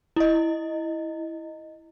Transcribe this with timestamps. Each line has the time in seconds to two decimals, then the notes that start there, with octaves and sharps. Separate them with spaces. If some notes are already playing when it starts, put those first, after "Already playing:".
0.16 E4 D#5